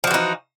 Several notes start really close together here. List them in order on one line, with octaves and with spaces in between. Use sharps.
F3 F#4 E3 D#4